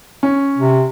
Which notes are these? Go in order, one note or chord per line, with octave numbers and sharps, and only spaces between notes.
C#4
C3